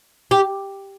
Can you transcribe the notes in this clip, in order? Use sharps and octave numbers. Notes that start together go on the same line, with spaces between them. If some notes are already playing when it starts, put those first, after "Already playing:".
G4